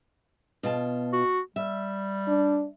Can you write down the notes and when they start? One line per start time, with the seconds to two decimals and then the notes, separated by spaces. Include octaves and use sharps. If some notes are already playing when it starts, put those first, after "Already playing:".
0.63 B2 F4 A5
1.13 F#4
1.56 G3 E5
2.28 D4